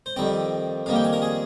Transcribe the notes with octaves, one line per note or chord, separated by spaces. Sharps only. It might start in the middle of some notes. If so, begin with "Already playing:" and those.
C5
F2 D#3 G3 C4 D5
F2 D#3 G3 A#3 F5
G5
G#5
A#4
G#4